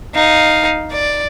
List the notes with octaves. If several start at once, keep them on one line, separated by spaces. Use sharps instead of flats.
D#4 F5
D5